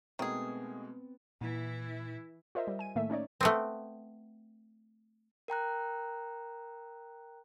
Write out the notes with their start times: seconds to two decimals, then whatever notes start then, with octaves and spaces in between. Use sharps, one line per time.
0.19 B2 D#3 G#3 A3 B3 C4 G#4
1.41 A#2 E3 E4
2.55 F4 A#4 C5 D#5 E5
2.67 G3
2.79 G#5 D#7
2.96 A2 D#3 A3 A#3 E5
3.10 C#4 D#4 C#5 D5
3.41 A3 B3 C4
5.48 A#4 G5 A#5 F#6